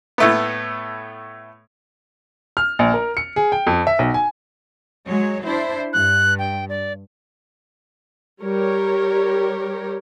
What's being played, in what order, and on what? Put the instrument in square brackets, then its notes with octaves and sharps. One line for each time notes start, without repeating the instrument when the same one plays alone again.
[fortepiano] A2 A3 B3
[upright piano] F6
A#1
A#4
C#7
G#4
G5
F2
E5
B1
G#5
[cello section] F#3 G#3 C#5
D4 E4 C5
[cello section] G2 [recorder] F#6
[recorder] G5
D5
[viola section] G3 G4 A#4 C#5